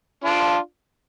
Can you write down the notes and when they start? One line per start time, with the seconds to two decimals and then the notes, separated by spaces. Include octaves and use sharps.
0.24 D4 F4